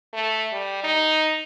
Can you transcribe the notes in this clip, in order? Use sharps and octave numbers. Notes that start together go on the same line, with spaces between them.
A3
G3
D#4